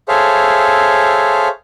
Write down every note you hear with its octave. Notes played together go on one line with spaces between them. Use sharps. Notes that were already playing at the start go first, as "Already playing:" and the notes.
G#4 A4 C5 C#5 E5 F5